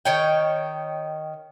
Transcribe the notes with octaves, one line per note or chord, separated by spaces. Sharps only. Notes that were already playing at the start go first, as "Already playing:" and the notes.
D#3 C#5 G5